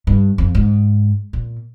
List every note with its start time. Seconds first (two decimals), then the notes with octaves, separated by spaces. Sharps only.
0.07 G2
0.38 F2
0.55 G#2
1.33 A#2